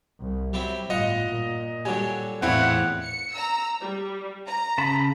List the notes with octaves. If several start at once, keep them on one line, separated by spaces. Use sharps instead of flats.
C2
F#3 G3 C4 E4
G1 A2 F4 D#5 F#5
A#2
D3 F#3 G3 G#5
E2 A2 E3 F3 C4 C#4 E4 F#5
C#7
A#5 E6
G3
A#5
C#3 A5 B5